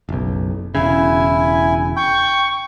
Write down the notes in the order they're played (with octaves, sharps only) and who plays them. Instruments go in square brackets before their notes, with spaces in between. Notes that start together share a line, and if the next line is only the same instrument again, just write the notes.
[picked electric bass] F#1 B1
[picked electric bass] E1 C#3 [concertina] E4 G#5
[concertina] G5 [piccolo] C#6